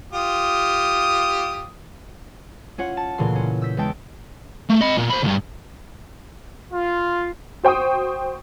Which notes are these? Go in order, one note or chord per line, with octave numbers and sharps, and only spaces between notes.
F4 G4 D#6
C#4 F4 C#5 F#5
A5
D2 A#2 C#3 E3 C6
C#4
E6 G6 B6
E2 G#3 G5 A5 D7
A3
D#5 B5
A#2
C5 B5
D2 G2
F4
F#4 C5 G5 C#6 D#6